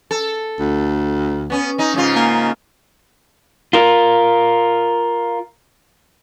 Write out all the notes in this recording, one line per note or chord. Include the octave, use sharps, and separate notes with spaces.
A4
D2
B3 C#4
C#4 D#4
G#2 C#3 F4
A#3
F4 A#4